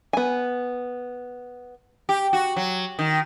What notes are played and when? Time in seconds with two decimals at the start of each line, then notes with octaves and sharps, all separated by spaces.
0.13 B3 G#5
2.09 G4
2.33 F#4
2.56 F#3
2.99 D#3